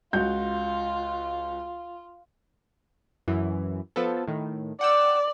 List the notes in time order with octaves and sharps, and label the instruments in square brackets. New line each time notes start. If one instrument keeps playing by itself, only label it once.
[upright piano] C#2 F#4 G6 [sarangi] F4
[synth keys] F#2 E3
F3 B3 A4
A2 D#3
[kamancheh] D5 [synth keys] F#5 G5 E6